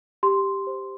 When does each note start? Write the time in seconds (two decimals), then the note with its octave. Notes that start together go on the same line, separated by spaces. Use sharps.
0.23 G4 C6
0.67 C5